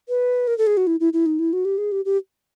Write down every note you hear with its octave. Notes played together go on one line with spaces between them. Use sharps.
B4
A#4
A4
G#4
F#4
E4
E4
E4
D#4
E4
F#4
G4
G#4
G4
G4